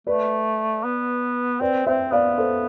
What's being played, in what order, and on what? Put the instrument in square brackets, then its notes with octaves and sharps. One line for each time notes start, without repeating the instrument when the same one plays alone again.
[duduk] A3 [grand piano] B4 D5
[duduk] B3
[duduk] C4 [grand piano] B4 D5
[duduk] C4 [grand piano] C5 E5
[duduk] B3 [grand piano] D5 F5
[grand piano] A4 C5